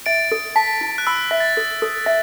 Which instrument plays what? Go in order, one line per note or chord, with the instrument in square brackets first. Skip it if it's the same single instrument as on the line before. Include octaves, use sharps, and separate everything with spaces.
[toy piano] E5 [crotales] A6 D7
[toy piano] A4
[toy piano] A5 [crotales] B6
[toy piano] E4
[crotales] F#6
[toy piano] B5 [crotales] E6
[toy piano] E5
[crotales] A6
[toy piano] A4
A4
E5